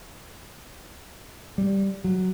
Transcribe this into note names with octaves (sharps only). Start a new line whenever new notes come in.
G3
F#3